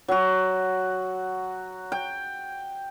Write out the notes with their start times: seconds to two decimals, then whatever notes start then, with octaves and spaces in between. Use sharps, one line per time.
0.08 F#3 F#4
1.92 G5